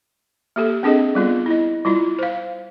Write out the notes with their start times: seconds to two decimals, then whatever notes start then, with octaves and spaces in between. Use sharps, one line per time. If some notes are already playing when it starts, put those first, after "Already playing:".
0.56 A#3 G4 A4
0.83 C4 D4 G#4 A4 D#5
1.15 G3 B3 F4
1.46 E4 D#5
1.85 G3 E4 F4
2.19 C5 F5